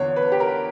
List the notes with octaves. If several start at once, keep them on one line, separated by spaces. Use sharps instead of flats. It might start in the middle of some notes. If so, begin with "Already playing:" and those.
Already playing: E2 D3 C#5
B4
G4
A#4